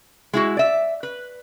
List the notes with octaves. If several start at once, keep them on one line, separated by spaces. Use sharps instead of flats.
G#3 E4 F#4
D5 E5
B4